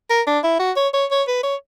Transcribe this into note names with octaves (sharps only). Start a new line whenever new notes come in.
A#4
D4
E4
F#4
C#5
C#5
C#5
B4
C#5